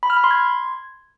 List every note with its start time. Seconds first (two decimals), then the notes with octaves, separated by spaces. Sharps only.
0.03 B5
0.10 F6
0.17 B5
0.24 C6
0.31 G#6